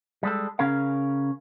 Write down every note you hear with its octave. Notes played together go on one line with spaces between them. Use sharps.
G3 G#3 A4
C#3 C#4 G#4 A#4 F5